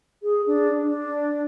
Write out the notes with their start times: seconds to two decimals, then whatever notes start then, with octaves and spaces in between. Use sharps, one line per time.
0.23 G#4
0.47 D4
0.83 D4